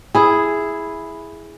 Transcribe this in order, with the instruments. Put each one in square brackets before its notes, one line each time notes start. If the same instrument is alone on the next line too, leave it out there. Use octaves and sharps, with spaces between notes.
[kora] E4 G#4